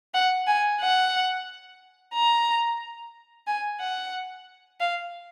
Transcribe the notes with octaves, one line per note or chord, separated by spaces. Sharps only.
F#5
G#5
F#5
A#5
G#5
F#5
F5